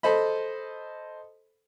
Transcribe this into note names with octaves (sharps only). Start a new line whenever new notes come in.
A4 C5 D#5 B5